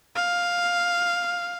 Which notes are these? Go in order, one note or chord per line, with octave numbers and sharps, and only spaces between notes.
F5